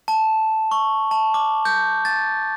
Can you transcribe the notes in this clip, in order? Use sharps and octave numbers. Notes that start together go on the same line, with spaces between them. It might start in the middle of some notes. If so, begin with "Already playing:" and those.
A5
C#6
A5
D6
G6
A6